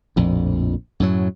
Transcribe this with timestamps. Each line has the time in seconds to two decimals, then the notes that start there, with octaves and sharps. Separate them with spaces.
0.16 A#1 F2 A2
1.00 F#2 A2 F#3